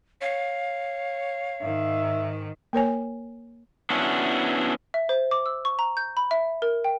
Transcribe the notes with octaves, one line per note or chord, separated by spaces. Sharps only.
C#5 F5
G#2 D#3 E5
A#3 A#4 C#5 G#5
B3 C#4 D4 E4 F#4
E5
C5
D6
E6
C#6
A#5
G6
B5
E5
A#4
G5